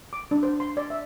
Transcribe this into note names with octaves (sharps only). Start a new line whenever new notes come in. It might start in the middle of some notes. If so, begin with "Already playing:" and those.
D6
D4
C5
C6
D5
E5